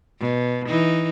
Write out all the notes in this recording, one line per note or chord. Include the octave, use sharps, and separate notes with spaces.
B2
E3 D#4